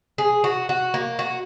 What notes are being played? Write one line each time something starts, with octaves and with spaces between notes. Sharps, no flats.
G#4
F#4
F#4
A#3
F#4